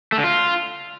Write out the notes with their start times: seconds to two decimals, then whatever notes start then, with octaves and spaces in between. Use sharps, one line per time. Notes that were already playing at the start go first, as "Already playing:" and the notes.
0.12 A3
0.18 D3
0.24 F4